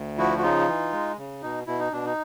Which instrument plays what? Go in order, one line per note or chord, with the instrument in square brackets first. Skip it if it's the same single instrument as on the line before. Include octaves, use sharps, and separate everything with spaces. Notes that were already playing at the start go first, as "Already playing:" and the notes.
Already playing: [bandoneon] D2
F3 E4 F#4
F#4
C#3 D#4 F4
E3
G#3
C#3
B2 D#4
B2 E4
D#4
B2 D4
D#4